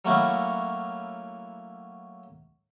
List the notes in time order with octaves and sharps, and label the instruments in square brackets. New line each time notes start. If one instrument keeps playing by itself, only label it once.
[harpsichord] F#3 A3 A#3 C#4 E4 F#4